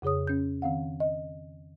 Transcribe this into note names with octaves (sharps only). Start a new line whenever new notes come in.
F2 C#3 G#4 C#5 D#6
C#4 G6
D#3 C4 F5 F#5
D#5